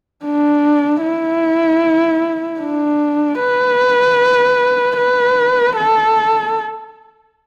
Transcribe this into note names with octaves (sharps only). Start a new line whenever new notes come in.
D4
E4
D4
B4
B4
A4